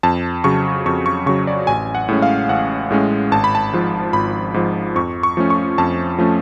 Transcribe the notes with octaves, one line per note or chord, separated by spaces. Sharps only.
F2 A5
C#3 F#3 C#6
F2 C#6
C#6
C#3 F#3 C#6
D5
A1 G#5
F#5
A2 G#3 C#4
F5
A1 F#5
A2 G#3 C#4
G#1 A5
B5
A5
G#2 F3
G#1 B5
G#2 F3
F2 C#6
C#6
F3 A3 C#4
C#6
F2 A5
F3 A3 C#4